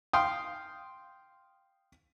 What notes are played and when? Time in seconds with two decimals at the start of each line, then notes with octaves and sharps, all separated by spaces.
0.13 F5 G5 C6 D#6